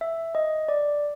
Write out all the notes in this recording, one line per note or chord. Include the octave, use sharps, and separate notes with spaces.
E5
D#5
D5